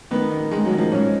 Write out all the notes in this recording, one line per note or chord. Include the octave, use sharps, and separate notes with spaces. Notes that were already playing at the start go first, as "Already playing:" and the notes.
D#3 B3
D#3
D#3 G#3
F#3
D#3
F3
G#2 C#4